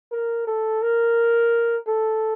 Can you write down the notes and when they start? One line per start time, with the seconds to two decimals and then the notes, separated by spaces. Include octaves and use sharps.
0.11 A#4
0.47 A4
0.82 A#4
1.87 A4